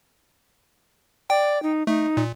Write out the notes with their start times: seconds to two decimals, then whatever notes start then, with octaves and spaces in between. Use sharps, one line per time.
1.30 D5 G5
1.63 D#4
1.87 A3 D#4
2.17 A#2